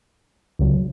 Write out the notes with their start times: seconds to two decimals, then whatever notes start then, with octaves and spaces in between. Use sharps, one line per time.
0.59 C#2 C#3 F#3